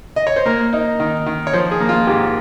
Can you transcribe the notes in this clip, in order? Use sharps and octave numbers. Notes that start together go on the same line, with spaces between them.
D#5
C#5
C5
A#3 A#4
D#4
D#3
D#3
C#5
F3 C5
G#4
A#3
F4
G#2 G4